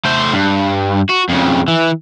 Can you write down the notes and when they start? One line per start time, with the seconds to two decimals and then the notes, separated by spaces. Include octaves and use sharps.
0.05 A3 C5
0.33 G2
1.10 F#4
1.29 F2 C#3
1.68 E3